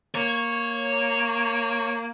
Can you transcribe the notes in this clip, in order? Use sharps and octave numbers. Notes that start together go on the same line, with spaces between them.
A#3 C#5